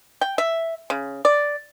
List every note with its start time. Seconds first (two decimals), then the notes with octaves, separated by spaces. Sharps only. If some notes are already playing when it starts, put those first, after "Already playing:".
0.21 G5
0.38 E5
0.90 C#3
1.25 D5